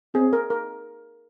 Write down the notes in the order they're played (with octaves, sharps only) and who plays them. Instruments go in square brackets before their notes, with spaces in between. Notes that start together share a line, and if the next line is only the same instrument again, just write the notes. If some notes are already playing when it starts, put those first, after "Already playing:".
[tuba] C4 [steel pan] G#4
[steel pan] A#4
A#4